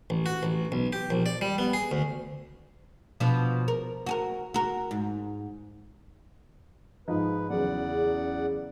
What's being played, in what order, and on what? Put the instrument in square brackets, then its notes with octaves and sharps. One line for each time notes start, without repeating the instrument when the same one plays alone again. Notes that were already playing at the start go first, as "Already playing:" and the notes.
[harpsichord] A1
F#4
A1
B1
G4
A#1
D5
G3
B3
G#4
D2
[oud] B2 F3 D4
A#4
F#4 G#4 A#4
F#4 A#4
G#2
[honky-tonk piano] G#2 F3 D#4 [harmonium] B4
[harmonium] E2 D5 F#5 [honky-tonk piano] C#3 F#3